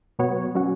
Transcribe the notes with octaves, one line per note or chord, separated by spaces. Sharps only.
B2 F#3 B3 F#4 C#5
F#3 C#4 F#4